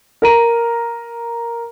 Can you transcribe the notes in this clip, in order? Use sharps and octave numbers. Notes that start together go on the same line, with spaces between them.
A#4 A#5 D#7